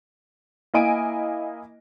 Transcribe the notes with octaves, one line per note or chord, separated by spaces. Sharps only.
A#3 E4 D#5 G#5 D7 D#7